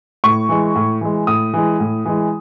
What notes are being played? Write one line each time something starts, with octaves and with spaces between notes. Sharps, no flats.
A2 C#6
E3 G#3
A2
E3 G#3
A2 D#6
E3 G#3
A2
E3 G#3